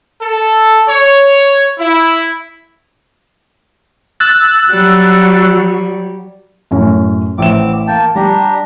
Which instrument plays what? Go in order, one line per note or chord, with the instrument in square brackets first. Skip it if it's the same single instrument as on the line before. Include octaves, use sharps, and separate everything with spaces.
[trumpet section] A4
C#5
E4
[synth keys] E6 F#6 A6
[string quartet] F#3 G3
[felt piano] F#2 A2 C#4
[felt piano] A1 E5 E7 [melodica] C4 D6
[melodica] A#3 G5 A5
[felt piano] G3 [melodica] D4 G4 A#5